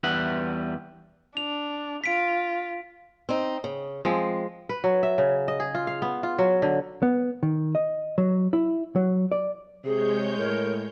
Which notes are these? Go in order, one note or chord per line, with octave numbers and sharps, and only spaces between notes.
E2 G3 E4 B4 F#5
D4 F7
F4 B6 D7
C4 D#4
C#3
F3 G#3 C4
B4
F#3
E5
C#3
D#5
G#4
F4
F5
B3
F4
F#3
D3
B3
D#3
D#5
F#3
E4
F#3
D5
C3 G#3 G#4 C#5 G6
A2 A#4